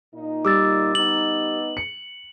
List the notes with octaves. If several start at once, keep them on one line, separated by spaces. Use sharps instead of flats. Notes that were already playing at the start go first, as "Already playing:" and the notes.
A#2 D#4
G3 D6 E6 A6
B3 D#4 F#7
C#7